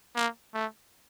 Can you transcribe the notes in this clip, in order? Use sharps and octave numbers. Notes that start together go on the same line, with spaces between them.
A#3
A3